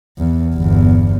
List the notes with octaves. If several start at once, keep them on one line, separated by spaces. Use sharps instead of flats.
E2
G1 E2